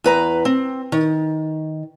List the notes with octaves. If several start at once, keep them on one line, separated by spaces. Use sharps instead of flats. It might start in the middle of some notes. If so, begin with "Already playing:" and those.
E2 B4 A#5
C4
D#3